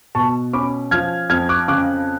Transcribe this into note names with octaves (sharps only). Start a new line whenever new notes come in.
B2 A5 C#6
C#4 B5 D6
F3 F6 G#6
F2 F6 G#6
D6 F#6
C#3 D6 F#6